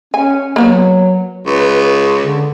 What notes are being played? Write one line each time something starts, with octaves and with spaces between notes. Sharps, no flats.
C#4 G#5
F#3 A#3 B3 F#4
C#2 B4
D3